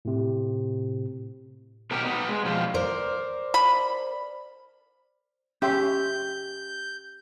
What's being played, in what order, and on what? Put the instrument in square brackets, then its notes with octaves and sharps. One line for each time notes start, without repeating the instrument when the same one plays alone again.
[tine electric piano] A2 C3
[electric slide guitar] B2 D#3 B3 G4 A#4
B3 D#4
G#3
B2 F3 G3 F4
[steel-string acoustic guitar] A#4 C5 D5
[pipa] B5
[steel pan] C#4 E5 C6 [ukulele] G4 [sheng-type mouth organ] G6